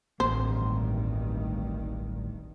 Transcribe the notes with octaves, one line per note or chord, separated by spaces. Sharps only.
D1 A1 G2 D#3 A#3 C4 C5